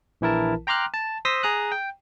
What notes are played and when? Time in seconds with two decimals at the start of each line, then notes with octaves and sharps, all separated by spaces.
0.21 A#1 E3 E4 A#4 A5
0.67 G5 A#5 C6 D6 F6 F#6
0.94 A5
1.25 C5 C6 D#6 E6 A#6 B6
1.43 G#4 A#5 D#6 F#6
1.72 G5